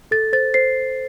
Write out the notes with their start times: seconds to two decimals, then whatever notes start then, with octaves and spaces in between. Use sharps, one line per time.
0.11 A4 A6
0.33 C5 A6
0.54 C5 C7